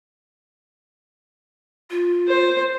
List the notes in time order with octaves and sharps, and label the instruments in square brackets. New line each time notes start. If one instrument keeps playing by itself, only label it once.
[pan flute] F4
[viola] C5